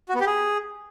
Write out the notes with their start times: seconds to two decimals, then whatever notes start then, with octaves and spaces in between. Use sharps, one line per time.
0.09 F#4
0.15 B3
0.21 G4
0.26 G#4